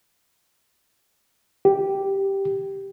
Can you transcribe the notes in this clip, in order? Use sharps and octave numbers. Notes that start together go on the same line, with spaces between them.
G4